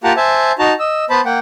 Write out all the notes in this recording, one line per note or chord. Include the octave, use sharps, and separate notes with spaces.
A#3 F4 G4 F#5 A5 A#5
C5 E5 G#5 A5
D#4 F#4 A5 A#5
D#5 E6
B3 C5 A5 B5
A#3 F#5 G5